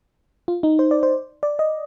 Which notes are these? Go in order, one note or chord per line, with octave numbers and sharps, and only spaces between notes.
F4
D#4
C5
D5
C5
D5
D#5